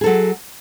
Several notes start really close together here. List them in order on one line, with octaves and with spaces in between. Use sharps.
G#4 A4 F#3